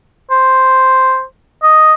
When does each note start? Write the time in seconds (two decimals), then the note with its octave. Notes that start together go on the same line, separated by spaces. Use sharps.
0.31 C5
1.63 D#5